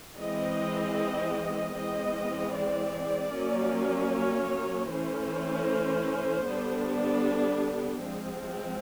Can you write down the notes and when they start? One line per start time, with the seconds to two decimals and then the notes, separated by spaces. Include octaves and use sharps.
0.17 E3 G#3 C4 D#5
1.75 E3 G#3 C4 D#5
2.54 D5
3.32 F#3 A#3 C#4
4.10 C#5
4.89 E3 A3 C#4 C5
6.47 D3 G3 B3 D4
8.04 F3 G#3 C4